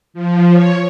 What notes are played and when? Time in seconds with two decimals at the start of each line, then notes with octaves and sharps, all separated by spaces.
0.14 F3
0.52 C#5